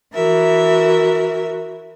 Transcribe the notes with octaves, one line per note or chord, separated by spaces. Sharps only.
E3 F#4 A#4 E5